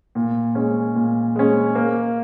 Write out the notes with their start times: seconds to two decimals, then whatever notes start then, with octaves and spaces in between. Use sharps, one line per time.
0.15 A#2
0.55 G#3 C#4
0.95 A#2
1.36 G#3 C#4
1.75 A#3